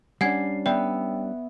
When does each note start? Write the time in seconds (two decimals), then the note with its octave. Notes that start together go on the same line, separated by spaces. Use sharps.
0.21 G3 C#4 D4 F#5 G#5 G#6 C7
0.66 B3 D5 E5 G5